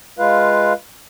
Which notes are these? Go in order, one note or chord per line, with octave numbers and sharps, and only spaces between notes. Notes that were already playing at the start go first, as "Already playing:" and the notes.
G#3 F4 B4 F5